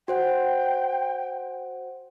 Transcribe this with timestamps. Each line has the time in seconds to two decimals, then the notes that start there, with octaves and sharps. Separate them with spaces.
0.08 F#4 C5 F#5 G5